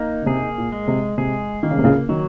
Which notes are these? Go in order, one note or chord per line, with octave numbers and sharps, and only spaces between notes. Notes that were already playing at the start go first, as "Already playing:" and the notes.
Already playing: A#3 D#4
C#3
C3 G#4
A#2
G#3
C3
C3 G#4
D#3 A#3
C#3
C3
C#2 C#3
D#3 F#3